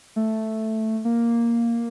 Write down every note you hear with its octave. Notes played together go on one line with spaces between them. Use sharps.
A3
A#3